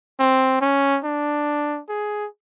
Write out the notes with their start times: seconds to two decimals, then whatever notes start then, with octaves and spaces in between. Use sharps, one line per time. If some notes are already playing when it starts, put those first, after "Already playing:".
0.19 C4
0.61 C#4
1.04 D4
1.89 G#4